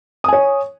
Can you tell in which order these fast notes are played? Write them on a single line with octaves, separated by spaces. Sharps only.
D#6 G#5 C#5